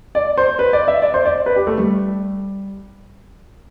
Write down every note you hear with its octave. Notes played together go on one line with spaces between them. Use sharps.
D5
C5
B4
D5
E5
D5
C5
D5
B4
G4
A3
G3